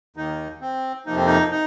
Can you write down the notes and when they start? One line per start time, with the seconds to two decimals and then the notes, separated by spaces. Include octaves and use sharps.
0.16 D#2 D#3 A#3 D#4
0.61 C4
1.06 F2 C3 F3 A#3 D#4
1.16 C4
1.26 D#4
1.51 D#4